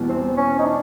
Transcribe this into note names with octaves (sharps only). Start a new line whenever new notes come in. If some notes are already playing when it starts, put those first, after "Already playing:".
Already playing: E2 B2 G3
C4
C#4
D#4
D4